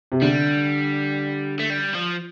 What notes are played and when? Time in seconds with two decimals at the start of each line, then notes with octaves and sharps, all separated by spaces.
0.12 C3
0.22 D3 G3
1.60 A3
1.70 G3
1.94 F3